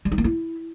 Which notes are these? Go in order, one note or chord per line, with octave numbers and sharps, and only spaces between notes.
G3
D#4
A#3
E4